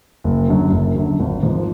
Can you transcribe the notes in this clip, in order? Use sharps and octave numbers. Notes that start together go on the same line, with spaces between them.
F#1
F#2 D3
F#1
F#2 D3
G#1
G#2 F3